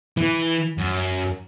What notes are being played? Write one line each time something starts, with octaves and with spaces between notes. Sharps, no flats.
E3
F#2